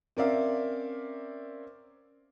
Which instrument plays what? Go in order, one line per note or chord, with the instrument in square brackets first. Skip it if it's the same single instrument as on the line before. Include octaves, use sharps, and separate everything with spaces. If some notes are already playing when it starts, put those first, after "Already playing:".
[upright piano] C4 C#4 A#4 D5 E5 F5